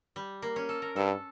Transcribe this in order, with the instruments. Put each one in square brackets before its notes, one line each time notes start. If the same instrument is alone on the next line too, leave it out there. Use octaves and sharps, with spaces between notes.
[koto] G3
A#3
C#4
A4
A#4
[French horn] G2 [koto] A4